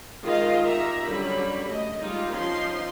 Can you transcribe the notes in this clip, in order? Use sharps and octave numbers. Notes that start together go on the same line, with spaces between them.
D#3 G#3 F4 D#5 F5
D#3 G4 A#4 E5 A#5
D3 F#3 G3 C#4 B5
A3 D#5
G3 G#3 D#4 F4
F3 C#4 D#4 C6